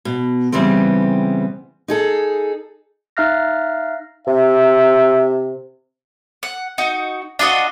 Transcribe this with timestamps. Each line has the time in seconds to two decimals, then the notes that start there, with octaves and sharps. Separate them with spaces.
0.05 B2
0.52 C#3 E3 G3 B3 C4
1.88 D#4 G#4 A4
3.17 D#4 E5 F5 F6 F#6 A#6
4.27 C3 E5
6.43 F#5
6.78 D#4 F#4
7.39 D4 F4 F#4 D#5